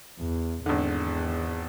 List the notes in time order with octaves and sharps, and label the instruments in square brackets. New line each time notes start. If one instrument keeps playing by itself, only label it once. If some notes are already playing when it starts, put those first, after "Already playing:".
[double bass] E2
[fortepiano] G#1 D3 [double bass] E2